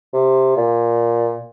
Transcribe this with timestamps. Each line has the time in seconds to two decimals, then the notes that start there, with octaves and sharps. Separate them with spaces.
0.14 C3
0.57 A#2